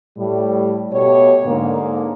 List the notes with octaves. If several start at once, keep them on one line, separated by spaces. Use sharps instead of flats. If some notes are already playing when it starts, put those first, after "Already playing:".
A2 G3
B2 A3 G4 C#5
G#2 D3 A#3